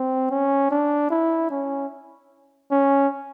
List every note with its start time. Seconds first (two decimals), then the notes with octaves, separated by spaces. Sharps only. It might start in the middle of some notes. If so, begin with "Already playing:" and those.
Already playing: C4
0.31 C#4
0.71 D4
1.11 E4
1.51 C#4
2.72 C#4